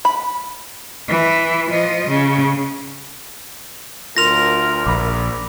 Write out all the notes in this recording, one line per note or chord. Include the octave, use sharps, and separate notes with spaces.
B5
E3
F3 D#5
C#3
D2 F4 A#4 C6 F6 A#6 F7
A#1 B5 D6